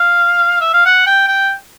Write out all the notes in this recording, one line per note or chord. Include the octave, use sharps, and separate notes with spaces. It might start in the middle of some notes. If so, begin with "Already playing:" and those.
Already playing: F5
E5
F5
F#5
G5
G5